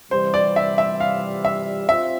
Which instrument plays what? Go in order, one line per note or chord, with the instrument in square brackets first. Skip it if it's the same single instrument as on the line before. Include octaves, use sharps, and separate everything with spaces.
[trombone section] C3 E3 G3 [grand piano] C5
[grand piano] D5
E5
E5
F5
E5
[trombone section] C4 F4 [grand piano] E5